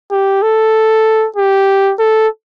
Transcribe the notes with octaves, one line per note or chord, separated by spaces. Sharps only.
G4
A4
G4
A4